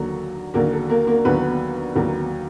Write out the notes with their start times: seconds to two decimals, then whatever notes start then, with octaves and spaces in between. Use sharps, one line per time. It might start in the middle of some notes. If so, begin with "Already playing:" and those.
Already playing: D#2 D3 F#3 A#3 A4
0.54 D#2 D3 F#3 A#3 A#4
0.73 A4
0.90 A#3 A#4
1.07 A#3 A#4
1.25 D#2 D3 F#3 A#3 B3 B4
1.95 D#2 D3 F#3 A#3